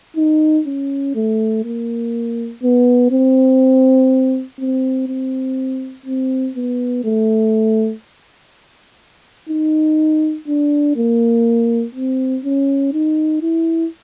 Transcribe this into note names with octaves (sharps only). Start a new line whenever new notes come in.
D#4
C#4
A3
A#3
B3
C4
C4
C4
C4
B3
A3
D#4
D4
A#3
C4
C#4
D#4
E4